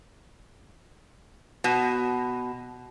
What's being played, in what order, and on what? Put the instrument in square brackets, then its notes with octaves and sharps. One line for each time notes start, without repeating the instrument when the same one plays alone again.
[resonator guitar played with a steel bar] B2